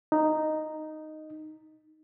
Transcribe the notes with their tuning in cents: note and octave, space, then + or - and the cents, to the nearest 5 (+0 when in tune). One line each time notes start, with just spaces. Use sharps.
D#4 -5